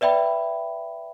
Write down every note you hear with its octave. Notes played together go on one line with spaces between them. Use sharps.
B4 D5 E5 G5 B5